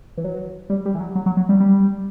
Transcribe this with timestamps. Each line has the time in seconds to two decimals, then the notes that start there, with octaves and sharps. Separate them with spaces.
0.17 E3
0.24 F#3
0.70 G3
0.85 G3
0.95 E3
1.00 F#3
1.15 F#3
1.26 F#3
1.37 F#3
1.49 G3
1.60 G3